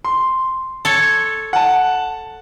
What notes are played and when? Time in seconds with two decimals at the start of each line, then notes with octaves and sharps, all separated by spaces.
0.04 C6
0.85 A4 C#5
1.53 F#5 A5